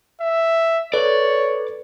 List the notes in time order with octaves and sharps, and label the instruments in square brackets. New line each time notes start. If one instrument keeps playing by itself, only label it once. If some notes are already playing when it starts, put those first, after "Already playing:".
[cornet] E5
[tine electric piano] A4 B4 [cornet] C#5 [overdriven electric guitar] D5